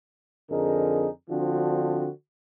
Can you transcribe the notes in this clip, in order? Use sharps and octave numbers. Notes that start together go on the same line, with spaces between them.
F2 D3 D#4 G#4 A#4
D3 F3 C4 D4 F#4